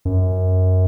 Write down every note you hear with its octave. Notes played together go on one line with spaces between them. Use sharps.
F#2